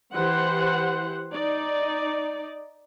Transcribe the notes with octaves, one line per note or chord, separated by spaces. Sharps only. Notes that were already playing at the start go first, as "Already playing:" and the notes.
E3 G4 C5 F#5
D#4 D5